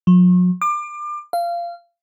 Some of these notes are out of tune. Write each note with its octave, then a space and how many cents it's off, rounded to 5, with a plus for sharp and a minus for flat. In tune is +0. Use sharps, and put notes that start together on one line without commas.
F#3 -45
D6 +30
F5 -20